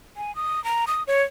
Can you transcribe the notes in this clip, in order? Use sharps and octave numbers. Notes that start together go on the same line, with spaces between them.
G#5
D#6
A#5
D#6
C#5